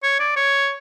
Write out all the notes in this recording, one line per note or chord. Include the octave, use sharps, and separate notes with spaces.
C#5
D5
C#5